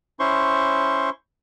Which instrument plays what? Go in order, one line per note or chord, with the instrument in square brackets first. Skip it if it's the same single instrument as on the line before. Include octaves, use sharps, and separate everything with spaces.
[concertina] C#4 E4 C5 C6 C#6